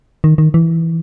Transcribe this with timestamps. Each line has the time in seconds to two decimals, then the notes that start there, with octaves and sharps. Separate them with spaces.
0.24 D#3
0.38 D#3
0.54 E3